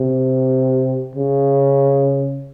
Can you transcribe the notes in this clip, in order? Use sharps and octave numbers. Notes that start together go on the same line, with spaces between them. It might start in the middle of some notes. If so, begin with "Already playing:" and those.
Already playing: C3
C#3